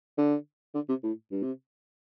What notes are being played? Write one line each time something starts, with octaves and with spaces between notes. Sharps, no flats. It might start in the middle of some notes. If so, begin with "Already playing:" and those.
D3
D3
C3
A2
G2
C3